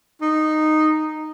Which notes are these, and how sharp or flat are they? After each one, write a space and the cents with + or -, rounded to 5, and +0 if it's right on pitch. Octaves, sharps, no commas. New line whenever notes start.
D#4 -10